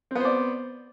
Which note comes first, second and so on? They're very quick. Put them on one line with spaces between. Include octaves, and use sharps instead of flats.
C4 B3 C5 D5